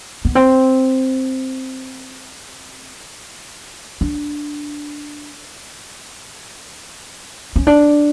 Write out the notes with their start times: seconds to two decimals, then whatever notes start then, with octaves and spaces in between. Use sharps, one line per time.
0.25 B3
0.35 C4
4.01 D4
7.56 C#4
7.67 D4